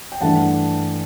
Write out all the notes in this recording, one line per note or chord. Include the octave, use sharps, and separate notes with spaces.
G5
G2 E3 A3 D4 F#5 A5